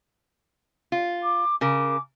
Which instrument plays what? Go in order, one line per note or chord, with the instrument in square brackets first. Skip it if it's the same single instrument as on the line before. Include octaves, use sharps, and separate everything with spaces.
[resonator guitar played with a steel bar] F4
[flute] D6
[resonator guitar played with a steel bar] C#3 A#4 [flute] D6